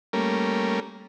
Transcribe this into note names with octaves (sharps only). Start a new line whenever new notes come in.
G3 A3 A#3 C#4 A#4